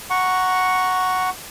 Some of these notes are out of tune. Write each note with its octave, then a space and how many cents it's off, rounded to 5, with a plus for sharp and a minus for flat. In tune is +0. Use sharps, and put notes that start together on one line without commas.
F#5 +0 A#5 +0 C#6 +0